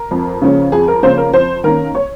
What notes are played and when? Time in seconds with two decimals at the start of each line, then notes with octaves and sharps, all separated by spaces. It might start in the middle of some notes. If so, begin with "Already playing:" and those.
Already playing: A#4
0.11 F2
0.42 C#3 F3 A#3 C#4
0.72 F2 G#4
0.88 A#4
1.03 C#3 F3 A#3 C#4 C5
1.18 A#4
1.33 F2 C5
1.64 D#3 A#3 C#4 A#4
1.95 C#5